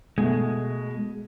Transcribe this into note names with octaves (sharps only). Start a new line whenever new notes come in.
B2 G#3 A3